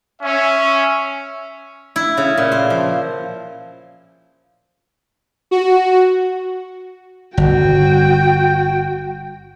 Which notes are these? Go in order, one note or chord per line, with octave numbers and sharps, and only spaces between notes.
C#4 E5
E4
C#3
A#2
C5
F3
F#4
G1 F#4 G5